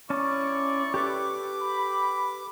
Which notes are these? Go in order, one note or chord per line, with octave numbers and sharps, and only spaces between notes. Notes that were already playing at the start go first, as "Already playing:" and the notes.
C#4 E4 D5 A5 C#6
G4 A4 B4 D6
B5